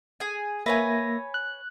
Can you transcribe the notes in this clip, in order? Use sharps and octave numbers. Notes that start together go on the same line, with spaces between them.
G#4 G#5
A#3 B4 C#5 E5 G#5 A#6
F#6